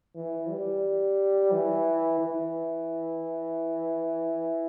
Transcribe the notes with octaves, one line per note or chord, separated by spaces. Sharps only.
E3
G3
E3
E3